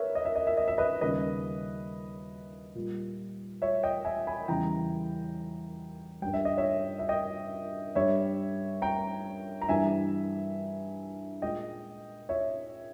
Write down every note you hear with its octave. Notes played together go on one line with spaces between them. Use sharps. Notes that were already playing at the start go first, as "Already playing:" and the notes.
Already playing: A#4 B4 C#5 E5
D#5
E5
D#5
E5
D#5
E5
B4 D#5
D#2 C#3 G3 B4 D#5
A#2 G3
C#5 E5
D#5 G5
E5 G#5
G#5 B5
E2 C#3 G3 G5 A#5
G2 G3 G5
E5
D#5
C#5 E5
E5
D#5 G5
G2 G3 C#5 E5
G5 A#5
A#5
G2 E3 G3 E5 G#5
A#2 G#3 D#5 G5
C#5 E5